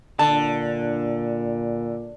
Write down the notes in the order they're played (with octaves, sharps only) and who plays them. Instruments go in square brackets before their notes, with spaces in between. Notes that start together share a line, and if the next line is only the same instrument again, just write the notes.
[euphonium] A#2 [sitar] D3 [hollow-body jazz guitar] A5